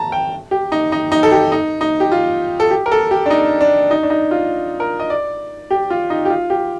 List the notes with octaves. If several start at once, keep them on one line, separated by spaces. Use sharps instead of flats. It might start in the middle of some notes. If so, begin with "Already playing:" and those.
Already playing: A5 A#5
G5
G4
D#4
D#4
D#4
A4
G4
D#4
D#4
G4
F4
A4
G4
A#4
A4
G4
D4
D#4
D4
D#4
D4
D#4
F4
A#4
D#5
D5
G4
F4
D#4
G4
F4
G4